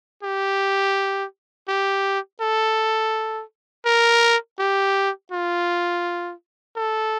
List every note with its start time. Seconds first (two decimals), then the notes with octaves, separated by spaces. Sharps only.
0.23 G4
1.68 G4
2.41 A4
3.86 A#4
4.59 G4
5.32 F4
6.76 A4